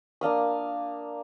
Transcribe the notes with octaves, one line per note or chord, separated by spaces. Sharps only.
A#3 D4 F5 D#6